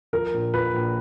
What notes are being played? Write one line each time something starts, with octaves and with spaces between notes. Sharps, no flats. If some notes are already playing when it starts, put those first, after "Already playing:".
F3 A#4
A#1
A#2 B4
A#1